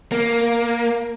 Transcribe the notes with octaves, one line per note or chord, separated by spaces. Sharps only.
A#3